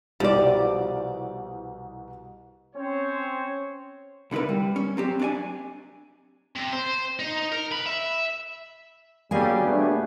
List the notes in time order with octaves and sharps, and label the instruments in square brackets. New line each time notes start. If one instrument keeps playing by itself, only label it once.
[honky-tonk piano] C2 B2 [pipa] F3 D5 [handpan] E4 G4
[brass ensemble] C4 C#4 C5 C#5
[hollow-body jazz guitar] C2 D3 E4 A#4 B4
G3
C#4
F#3 C4 G4
D4 D5 G#5
[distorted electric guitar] C3
C5
D#4
A#4
B4
E5
[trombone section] D3 F#3 G3 [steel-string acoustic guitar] A#3 G#4 G#5
[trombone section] B2 G3 B3 [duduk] A3 [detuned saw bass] D4